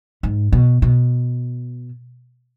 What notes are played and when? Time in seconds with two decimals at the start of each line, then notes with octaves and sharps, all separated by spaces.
0.23 G#2
0.52 B2
0.82 B2